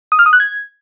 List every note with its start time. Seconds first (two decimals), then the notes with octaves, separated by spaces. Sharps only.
0.12 D#6
0.19 F6
0.26 D#6
0.33 F#6
0.40 G#6